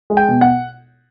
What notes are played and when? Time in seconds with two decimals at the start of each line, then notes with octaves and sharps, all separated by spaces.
0.10 G#3
0.17 G5
0.28 B2
0.41 F#5